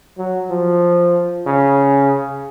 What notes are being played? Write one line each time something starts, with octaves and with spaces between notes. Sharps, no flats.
F#3
F3
C#3